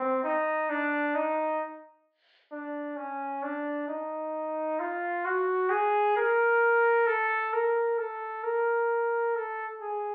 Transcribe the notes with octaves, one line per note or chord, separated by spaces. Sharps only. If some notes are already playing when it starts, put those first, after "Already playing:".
Already playing: C4
D#4
D4
D#4
D4
C#4
D4
D#4
F4
F#4
G#4
A#4
A4
A#4
A4
A#4
A4
G#4